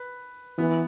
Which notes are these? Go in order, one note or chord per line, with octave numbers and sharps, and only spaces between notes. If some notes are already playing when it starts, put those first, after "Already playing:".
Already playing: B4
E3 B3